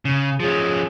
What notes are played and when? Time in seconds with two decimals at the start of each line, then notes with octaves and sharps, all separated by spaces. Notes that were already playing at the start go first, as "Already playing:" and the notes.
0.05 C#3
0.40 F3 C#4 G#4